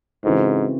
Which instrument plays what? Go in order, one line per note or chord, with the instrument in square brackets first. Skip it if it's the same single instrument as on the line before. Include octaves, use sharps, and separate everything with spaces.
[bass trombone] G#2 [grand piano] C#3 E3 C4 F#4 A4